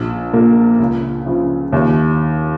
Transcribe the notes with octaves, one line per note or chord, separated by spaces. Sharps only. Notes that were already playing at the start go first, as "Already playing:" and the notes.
Already playing: A#1
A#2 A#3
C#2
C#3 F3
D#2